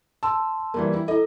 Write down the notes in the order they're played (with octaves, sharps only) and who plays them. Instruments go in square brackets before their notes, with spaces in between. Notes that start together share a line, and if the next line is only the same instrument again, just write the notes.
[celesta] A5 C6 [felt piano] E6
[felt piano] E3 G3 A#3
E4
[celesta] E4 A4 [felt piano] D#5